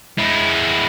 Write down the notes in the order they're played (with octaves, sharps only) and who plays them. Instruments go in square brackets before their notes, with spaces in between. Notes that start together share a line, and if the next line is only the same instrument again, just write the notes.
[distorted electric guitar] G#3 E4